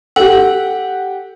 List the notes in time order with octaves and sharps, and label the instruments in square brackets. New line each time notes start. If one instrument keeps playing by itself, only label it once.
[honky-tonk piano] G4 F#5 [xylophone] A4